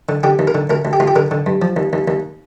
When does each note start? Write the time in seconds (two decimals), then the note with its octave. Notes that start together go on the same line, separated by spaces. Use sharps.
0.09 D3
0.23 D3 G4
0.39 D#2
0.47 A#4
0.55 D3
0.70 D2 A#4
0.85 D2
0.93 G4
1.00 D2 F4
1.08 G4
1.16 D3 A#4
1.31 D3
1.46 G2
1.62 F3
1.76 D#2
1.93 D#2
2.08 D#2